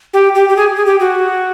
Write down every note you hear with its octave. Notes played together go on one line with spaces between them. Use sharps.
G4
G4
G4
G#4
G#4
G4
F#4